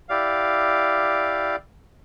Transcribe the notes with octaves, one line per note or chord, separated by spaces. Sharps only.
E4 G4 D5 F5